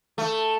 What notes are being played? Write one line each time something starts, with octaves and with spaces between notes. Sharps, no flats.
A3